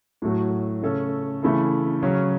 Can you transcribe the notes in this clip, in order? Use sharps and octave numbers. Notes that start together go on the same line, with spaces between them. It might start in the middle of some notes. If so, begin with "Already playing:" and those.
A2 F#3 A3 F#4
C#3 A3 C#4 A4
C#3 E3 A3 E4 A4
C#3 F#3 C#4